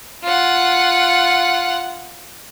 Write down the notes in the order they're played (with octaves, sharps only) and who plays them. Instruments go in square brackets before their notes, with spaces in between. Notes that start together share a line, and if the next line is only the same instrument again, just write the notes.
[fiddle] F4 F#5